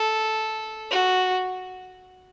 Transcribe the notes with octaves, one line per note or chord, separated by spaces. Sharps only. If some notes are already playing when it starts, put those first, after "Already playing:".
Already playing: A4
F#4